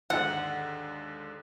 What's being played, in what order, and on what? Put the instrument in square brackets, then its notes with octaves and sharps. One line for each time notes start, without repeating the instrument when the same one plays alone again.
[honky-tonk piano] D#2 G#2 D3 [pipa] F#5